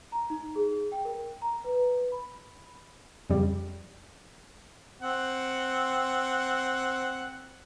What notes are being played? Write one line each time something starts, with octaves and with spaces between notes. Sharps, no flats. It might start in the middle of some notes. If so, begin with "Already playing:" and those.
A#5
D#4
G#4
G5
A#4
A#5
B4
B5
F2 C#3 G3
C4 F#5